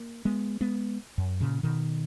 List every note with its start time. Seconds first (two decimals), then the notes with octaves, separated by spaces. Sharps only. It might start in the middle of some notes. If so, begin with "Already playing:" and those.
Already playing: A#3
0.25 G#3 B3
0.61 G#3 B3
1.18 F#2
1.40 A#2 C#3
1.63 B2 D#3